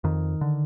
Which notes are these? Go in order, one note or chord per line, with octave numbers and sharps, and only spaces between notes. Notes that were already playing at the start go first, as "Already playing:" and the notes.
F2 D#3
D3